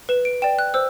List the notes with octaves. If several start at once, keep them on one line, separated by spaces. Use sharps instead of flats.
B4 E7
D7
D5 G5 E7
F#6
C5 E6